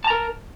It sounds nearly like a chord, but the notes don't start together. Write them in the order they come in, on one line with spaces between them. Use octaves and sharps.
A5 A#5 A#4